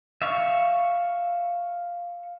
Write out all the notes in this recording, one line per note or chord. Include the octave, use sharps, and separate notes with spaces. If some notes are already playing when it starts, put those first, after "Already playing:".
E5 F5 C#6